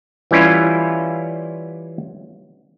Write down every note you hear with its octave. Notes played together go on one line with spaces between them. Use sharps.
E3 G3 C#4 E4 F4